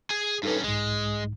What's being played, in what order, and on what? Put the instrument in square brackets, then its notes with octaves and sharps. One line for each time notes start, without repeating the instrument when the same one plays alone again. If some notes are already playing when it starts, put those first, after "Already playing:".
[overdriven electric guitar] G#4 G#5 [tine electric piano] G#6
[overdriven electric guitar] G2 C#4 [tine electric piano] D#4 A4 B4
[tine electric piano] B1 G#2 [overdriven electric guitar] G#3